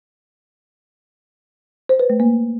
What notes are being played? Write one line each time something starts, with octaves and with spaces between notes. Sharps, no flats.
C5
B4
A3
A#3